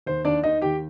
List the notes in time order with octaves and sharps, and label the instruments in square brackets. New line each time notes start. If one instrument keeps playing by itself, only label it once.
[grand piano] D#2 C5
D#2 D4 D5
D#3 D#4 D#5
D#2 G4 G5